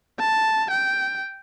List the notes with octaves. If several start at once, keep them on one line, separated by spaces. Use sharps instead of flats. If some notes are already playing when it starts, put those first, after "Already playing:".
A5
G5